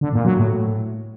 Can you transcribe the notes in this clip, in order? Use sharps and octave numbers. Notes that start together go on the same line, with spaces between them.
D3
A#2
F#3
A2